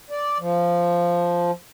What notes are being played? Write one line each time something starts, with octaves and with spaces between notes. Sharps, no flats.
D5
F3